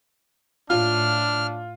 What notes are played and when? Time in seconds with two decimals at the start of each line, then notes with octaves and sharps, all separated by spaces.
0.70 A2 D4 F4 F6